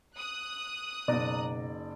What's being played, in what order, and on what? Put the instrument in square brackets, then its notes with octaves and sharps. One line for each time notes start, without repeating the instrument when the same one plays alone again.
[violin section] D#6 F#6
[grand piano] F#1 D#4 D5 [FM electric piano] B2 A#5